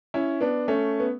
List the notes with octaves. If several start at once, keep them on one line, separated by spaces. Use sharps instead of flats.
C#4 E4
B3 D4
A3 C#4
B3